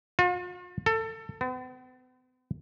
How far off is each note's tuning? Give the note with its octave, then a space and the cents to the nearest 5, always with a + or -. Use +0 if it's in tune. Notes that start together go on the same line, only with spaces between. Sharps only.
F4 +45
A4 +25
B3 +45